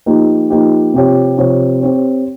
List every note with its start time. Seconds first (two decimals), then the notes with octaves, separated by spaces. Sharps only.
0.06 F3 A#3 D#4 G4
0.50 F3 A#3 D#4 G4
0.94 C3 F3 C4 G4 C#5
1.37 C3 F3 C4 G4 C#5
1.81 C4 G4 C#5